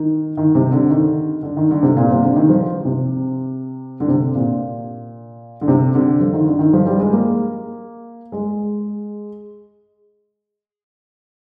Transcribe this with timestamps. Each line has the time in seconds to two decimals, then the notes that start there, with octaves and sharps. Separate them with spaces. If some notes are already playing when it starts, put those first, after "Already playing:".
Already playing: D#3
0.37 D#3
0.55 C3
0.72 D3
0.90 D#3
1.43 D3
1.57 D#3
1.71 D3
1.83 C3
1.97 A#2
2.10 C3
2.22 D3
2.36 D#3
2.49 F3
2.85 C3
4.00 D3
4.08 C3
4.35 A#2
5.61 D3
5.68 C3
5.95 D3
6.21 F3
6.33 D#3
6.47 D3
6.59 D#3
6.73 F3
6.87 G3
7.00 G#3
7.13 A#3
8.32 G#3